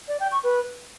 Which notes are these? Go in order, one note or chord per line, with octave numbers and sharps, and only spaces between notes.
D5
G5
C#6
B4